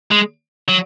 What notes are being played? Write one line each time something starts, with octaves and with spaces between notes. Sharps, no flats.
G#3
F#3